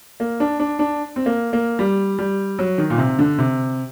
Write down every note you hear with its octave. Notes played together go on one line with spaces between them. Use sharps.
A#3
D4
D4
D4
C4
A#3
A#3
G3
G3
F#3
D#3
A#2
C3
D3
C3